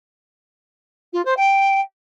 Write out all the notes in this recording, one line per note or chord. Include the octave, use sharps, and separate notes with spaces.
F4
C5
G5